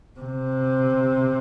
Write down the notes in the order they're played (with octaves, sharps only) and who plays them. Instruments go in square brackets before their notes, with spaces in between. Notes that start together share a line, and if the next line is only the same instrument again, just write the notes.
[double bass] C3